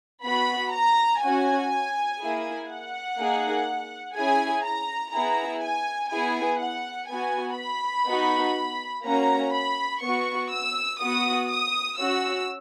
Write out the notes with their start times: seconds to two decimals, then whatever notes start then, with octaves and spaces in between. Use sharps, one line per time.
0.23 B3 F#4 B5
0.72 A#5
1.21 C#4 F#4 G#5
2.20 A#3 E4 G#4
2.68 F#5
3.17 A#3 D#4 G#4
4.15 C#4 E4 G#4 G#5
4.64 A#5
5.12 B3 E4 G#4 A#5
5.62 G#5
6.11 B3 E4 G#4 G#5
6.60 F#5
7.09 B3 F#4 G#5
7.58 B5
8.07 B3 D#4 F#4
9.04 A#3 C#4 F#4 A#5
9.53 B5
10.02 B3 F#4 C#6
10.51 E6
11.00 B3 F#4 D#6
11.49 D#6
11.98 C#4 F#4 E6